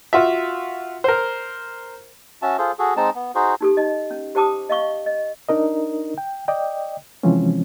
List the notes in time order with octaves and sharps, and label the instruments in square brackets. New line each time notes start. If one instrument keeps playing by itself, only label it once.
[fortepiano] F4 F#4 E5
A#4 C5
[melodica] C#4 F#4 E5 A5
F4 G#4 A4 C5
F#4 G#4 A4
G#3 C4 D#4 A5
B3
D#4 F#4 G#4 C5
[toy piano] D#4 G4 A4
D#4 D#5
C#4
G4 C5 G5 A5 D6 D#6
D#5 F5 C#6
D#5
[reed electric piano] D4 D#4 A#4 D#5
G5
D5 D#5 G5
C3 E3 F3 G#3 C4 C#4